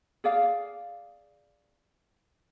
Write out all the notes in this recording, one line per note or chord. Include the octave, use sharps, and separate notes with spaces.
G#4 D5 F5